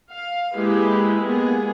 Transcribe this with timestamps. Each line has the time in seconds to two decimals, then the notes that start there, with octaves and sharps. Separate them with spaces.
0.10 F5
0.54 G#3 A#3 E4 G4 G#4 B4
1.21 G#3 A#3 B3 G#4